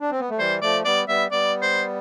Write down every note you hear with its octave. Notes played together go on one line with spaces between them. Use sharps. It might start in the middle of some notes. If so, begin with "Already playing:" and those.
D4
C4
B3
A3
E3 G3 C5
F3 A3 D5
G3 B3 D5
G3 B3 E5
G3 B3 D5
C5